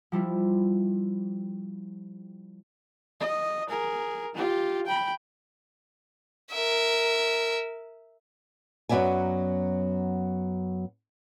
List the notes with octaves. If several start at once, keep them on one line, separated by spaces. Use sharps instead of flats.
F3 G3 E4 F4
D#5
G#4 A#4
F4 G4
G5 B5
A#4 E5
F#2 F#3 B3 D5 E5 G#5